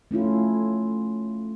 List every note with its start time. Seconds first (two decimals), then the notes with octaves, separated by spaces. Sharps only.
0.11 A3 C#4 E4 F4